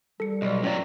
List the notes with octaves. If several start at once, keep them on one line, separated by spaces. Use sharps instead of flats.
G3 A4 C#7
B1 D5 D#5
A2 F#3 C#4 C#5 D5